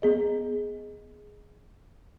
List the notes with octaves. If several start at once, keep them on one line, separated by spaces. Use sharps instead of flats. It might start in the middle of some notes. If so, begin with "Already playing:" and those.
B3 G#4 D#5